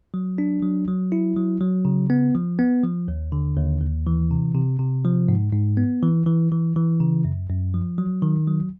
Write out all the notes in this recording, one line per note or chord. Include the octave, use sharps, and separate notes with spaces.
F#3
D4
F#3
F#3
E4
F#3
F#3
C#3
B3
F3
B3
F3
D#2
D3
D#2
D#2
E3
C3
C3
C3
F3
G#2
G#2
B3
E3
E3
E3
E3
C#3
F#2
F#2
F3
F#3
D#3
F#3